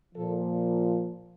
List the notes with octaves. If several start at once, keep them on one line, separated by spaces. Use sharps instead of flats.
A#2 F3 A4